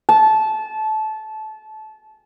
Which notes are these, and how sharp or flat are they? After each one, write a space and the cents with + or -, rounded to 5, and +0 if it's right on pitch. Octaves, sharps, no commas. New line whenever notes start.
A5 -20